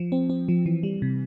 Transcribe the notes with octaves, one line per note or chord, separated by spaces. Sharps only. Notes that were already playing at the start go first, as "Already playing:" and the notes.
Already playing: F3
C4
C4
F3
E3
G3
C3